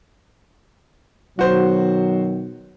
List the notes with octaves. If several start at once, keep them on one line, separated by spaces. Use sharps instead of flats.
B2 D#3 F#3 F#4 C5